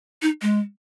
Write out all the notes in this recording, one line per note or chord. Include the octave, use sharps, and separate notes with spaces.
D#4
G#3